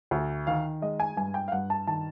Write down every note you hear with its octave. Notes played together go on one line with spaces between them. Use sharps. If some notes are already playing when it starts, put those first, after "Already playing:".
D2
D#3 F5
G#3 D#5
G#5
G2 G#5
G5
F5
G2 F#5
A5
D#3 A5